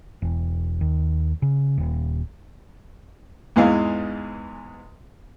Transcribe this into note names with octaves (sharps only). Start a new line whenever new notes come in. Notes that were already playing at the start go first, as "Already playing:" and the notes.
E1
D#2
C#3
D#1
E2 G#2 E3 G#3 F5